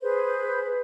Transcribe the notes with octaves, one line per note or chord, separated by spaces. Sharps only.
G#4 B4 C5